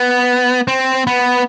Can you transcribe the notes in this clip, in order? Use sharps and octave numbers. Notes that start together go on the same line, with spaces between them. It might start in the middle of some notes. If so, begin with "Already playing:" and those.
Already playing: B3
C4
B3